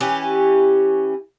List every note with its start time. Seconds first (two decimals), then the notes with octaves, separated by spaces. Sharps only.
0.01 E3 C#4 G4